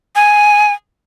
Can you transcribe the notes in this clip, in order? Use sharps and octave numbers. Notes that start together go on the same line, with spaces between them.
G#5